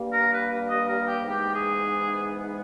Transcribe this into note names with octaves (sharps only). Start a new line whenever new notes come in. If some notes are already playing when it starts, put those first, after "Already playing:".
Already playing: G2 G3 A#3
A#4
B4
D#5
A#4
G4
G#2 E3 G#3 B3 G4
G#4